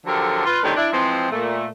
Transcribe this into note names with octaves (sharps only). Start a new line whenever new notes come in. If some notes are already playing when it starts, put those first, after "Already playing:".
D3 F3 F#3 G4 A4 A#4
F4 B4
A2 D3 D#3 C4 G4
D4 E4
E3 F3 G#3 C4
A#2 A3